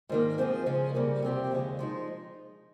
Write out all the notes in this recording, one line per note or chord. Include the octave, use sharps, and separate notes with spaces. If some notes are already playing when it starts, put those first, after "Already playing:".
G#2 D#3 A#3
F3 C4 F4 G#4
C#3 F3 G#3 C#4
F2 C#3 G3 A#3
C3 F3 C4 G4
D#2 C#3 G#3
F3 G#3 D#4